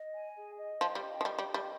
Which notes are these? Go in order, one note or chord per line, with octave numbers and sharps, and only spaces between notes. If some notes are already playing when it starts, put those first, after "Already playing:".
Already playing: D#5
G#5
G#4
D#5
F3 G5
G3
D#5
F3
G3 G5
G3
D#5
G3